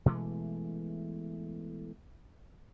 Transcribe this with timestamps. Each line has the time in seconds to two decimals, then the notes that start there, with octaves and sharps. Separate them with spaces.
0.06 B2 E3 G#3 A3